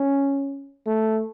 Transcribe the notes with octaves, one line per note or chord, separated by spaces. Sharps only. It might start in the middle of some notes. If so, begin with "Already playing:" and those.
Already playing: C#4
A3